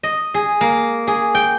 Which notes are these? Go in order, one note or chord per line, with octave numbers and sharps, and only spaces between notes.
D#5
G#4
A#3
G#4
G5